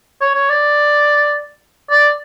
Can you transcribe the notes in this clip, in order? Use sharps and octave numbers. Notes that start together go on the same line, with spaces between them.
C#5
C#5
D5
D5